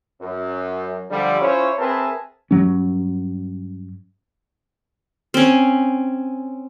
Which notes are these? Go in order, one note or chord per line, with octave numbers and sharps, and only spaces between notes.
F#2
D3 F3 G3
C#4 E4 F4 C5 C#5
C4 G#4 A#4 B4 E5 A5
G2 F#3 C#4
C4 C#4